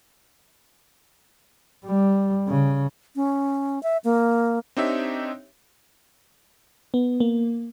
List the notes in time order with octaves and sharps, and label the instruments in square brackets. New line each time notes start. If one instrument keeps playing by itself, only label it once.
[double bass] G3
C#3
[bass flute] C#4
E5
A#3
[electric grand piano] C4 D4 D#4 G4 C#5 E5
[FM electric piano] B3
A#3